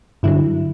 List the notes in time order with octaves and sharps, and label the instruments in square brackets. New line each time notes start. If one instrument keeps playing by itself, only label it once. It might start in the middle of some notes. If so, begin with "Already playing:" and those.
[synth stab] G2 D3 F#3 E4